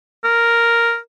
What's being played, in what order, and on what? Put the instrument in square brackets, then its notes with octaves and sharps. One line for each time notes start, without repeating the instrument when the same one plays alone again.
[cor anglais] A#4